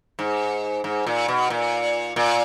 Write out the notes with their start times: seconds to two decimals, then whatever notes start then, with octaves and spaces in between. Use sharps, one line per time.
0.19 G#2
0.84 G#2
1.06 A#2
1.28 B2
1.50 A#2
2.16 A#2